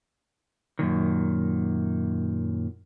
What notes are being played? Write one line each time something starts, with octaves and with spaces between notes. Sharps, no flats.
F#2 A#2 D#3